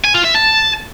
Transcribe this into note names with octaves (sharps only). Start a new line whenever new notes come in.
G#5
F4
E5
A5